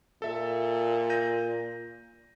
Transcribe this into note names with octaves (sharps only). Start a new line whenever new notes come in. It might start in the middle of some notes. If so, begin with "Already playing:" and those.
A#2 A4 E5
G6 A#6 D#7